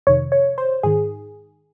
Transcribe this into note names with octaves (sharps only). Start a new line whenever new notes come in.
F2 C3 D#3 C#5
C#5
C5
G#2 D#3 G#4